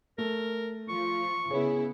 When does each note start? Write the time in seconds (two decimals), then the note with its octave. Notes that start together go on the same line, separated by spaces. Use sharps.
0.18 A3 A#4
0.89 F3 F4 C#6
1.51 C#3 B3 E4 G#4 C#5